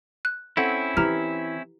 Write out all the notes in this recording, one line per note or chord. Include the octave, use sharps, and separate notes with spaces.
F#6
C4 C#4 E4 A4 F#5
E3 G4 A#5 F6